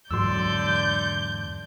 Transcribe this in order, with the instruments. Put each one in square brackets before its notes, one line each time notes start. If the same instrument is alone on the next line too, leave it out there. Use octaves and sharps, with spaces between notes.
[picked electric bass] E2 G#2 F#3 [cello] D3 D5 [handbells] C6 E6 [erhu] G6